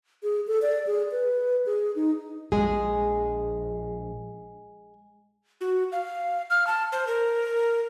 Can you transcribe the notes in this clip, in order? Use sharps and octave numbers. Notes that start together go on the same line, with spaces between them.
G#4
A4
D5
G#4
B4
G#4
D#4
A#1 G#3 G#4
F#4
F5
F6
A5
C5
A#4